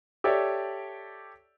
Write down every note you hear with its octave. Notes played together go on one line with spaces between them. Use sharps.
G4 A4 C#5 D5 E5